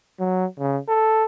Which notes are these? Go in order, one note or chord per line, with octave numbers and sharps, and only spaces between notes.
F#3
C#3
A4